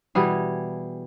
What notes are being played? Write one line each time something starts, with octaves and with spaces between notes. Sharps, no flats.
B2 E3 G3 G#4